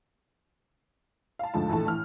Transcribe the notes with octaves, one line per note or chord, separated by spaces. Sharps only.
F5 A5
D2 G#2 F3 A3 A5
A#1 E3 A3 A5
A2 E3 F6